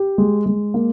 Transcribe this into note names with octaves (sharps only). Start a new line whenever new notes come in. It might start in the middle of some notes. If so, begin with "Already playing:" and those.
Already playing: G4
G#3
G#3
A#3